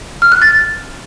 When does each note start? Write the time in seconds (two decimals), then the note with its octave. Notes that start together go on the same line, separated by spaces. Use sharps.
0.22 F6
0.32 F#6
0.42 A6